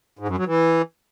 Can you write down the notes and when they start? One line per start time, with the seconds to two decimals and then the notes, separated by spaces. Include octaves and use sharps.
0.19 G#2
0.28 F#2
0.38 F#3
0.47 E3